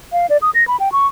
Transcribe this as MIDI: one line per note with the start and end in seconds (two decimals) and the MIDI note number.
0.13 0.26 77
0.30 0.37 74
0.42 0.50 87
0.55 0.67 94
0.68 0.77 83
0.80 0.92 79
0.92 1.07 85